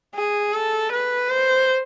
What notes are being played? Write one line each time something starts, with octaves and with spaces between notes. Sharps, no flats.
G#4
A4
B4
C5